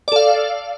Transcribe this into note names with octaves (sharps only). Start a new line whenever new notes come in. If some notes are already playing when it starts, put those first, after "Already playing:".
A4 D5 F5